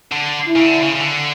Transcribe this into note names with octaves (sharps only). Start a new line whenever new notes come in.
D3
E4
C#3
D3
C#3
C#3
D3